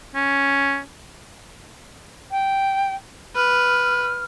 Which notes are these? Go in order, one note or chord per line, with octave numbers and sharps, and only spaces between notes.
C#4
G5
B4 F6